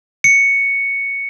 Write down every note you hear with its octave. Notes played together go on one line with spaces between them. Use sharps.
C#7